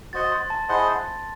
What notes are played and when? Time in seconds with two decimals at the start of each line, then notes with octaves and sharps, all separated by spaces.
0.13 F#4 C5 D#5 F#5 A6
0.32 C6
0.50 A5
0.69 E4 G#4 C5 D#5 F#5 C6